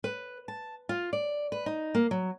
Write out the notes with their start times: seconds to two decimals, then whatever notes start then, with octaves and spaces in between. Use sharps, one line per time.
0.04 B4
0.48 A5
0.89 F4
1.13 D5
1.52 B4
1.66 D#4
1.95 A#3
2.11 F#3